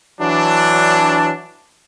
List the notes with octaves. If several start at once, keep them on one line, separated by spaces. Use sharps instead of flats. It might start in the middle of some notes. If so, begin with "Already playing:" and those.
E3 F#3 D4